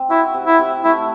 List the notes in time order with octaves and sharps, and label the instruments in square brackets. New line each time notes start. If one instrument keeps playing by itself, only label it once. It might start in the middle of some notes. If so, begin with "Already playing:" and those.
Already playing: [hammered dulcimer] C4
[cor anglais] E4 [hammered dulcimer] F#4
[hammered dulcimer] C3
[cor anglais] E4
[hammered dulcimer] C3
[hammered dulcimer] A3 [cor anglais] E4